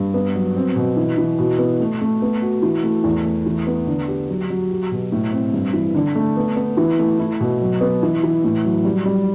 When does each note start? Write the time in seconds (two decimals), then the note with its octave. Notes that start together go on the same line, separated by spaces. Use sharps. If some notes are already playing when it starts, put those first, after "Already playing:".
Already playing: G2
0.14 B3
0.35 F#3
0.56 C4
0.76 B2
0.97 E3
1.17 E3
1.39 B2
1.59 B3
1.80 A3
2.01 A3
2.22 B3
2.42 F#4
2.62 E3
2.83 A3
3.04 E2
3.25 A3
3.46 E3
3.67 B3
3.87 D3
4.08 G4
4.29 F#3
4.50 F#3
4.71 G4
4.92 B2
5.12 A2
5.32 C4
5.54 G2
5.73 E3
5.94 D3
6.16 A3
6.37 B3
6.57 B3
6.77 E3
6.99 A3
7.19 E4
7.41 B2
7.61 F#3
7.81 B3
8.03 E3
8.23 E3
8.44 A2
8.64 F#3
8.84 G3
9.05 G3